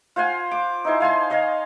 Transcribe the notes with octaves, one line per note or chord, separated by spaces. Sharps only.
F4 C5 F#5 G#5
D6
D#4 E4 C5 G#5
F5 G#5 A5 C6
C#5 D#5 F5 G#5